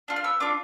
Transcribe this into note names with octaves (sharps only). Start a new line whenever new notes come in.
D4 F4
F6
B3 E6
D4 F4 D6